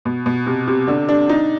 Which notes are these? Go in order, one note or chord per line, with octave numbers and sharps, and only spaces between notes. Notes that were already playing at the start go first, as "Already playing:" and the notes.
B2
B2
C3
C3
D3
D4
D#4